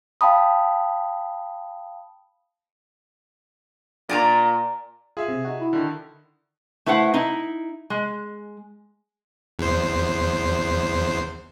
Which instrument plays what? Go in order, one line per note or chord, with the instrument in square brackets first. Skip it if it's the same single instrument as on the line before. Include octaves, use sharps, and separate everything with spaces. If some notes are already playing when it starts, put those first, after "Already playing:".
[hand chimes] F5 G5 A5 B5 D#6
[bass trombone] A#2 [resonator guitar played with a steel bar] D5 G#5 A#5
[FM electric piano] F4 [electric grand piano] G#4 E5
[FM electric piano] C3
D#4 F#4
[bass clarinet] E4
[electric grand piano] D3 D#3
[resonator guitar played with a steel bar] A3 E4 B4 C5 F#5
D#4 E4
G#3
[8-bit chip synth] E2 C5